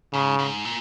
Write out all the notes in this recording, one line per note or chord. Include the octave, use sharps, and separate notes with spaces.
G#2 C#3
G#2
A#2